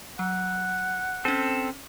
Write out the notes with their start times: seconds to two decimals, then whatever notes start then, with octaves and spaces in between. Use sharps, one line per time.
0.19 F#3 F#5
1.25 C4 C#4 A4 D#7